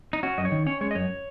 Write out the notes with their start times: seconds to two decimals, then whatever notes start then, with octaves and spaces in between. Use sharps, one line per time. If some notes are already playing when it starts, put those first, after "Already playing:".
0.13 D#4
0.23 C#4 F#4
0.38 F#2 D#5
0.45 C#5
0.52 D#3
0.66 C#4 C#5
0.81 G#3 C#5
0.91 D#5
0.95 F#2 C#5